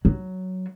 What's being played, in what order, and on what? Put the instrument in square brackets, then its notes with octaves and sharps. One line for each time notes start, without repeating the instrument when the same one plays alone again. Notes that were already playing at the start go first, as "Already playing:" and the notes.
[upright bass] F#3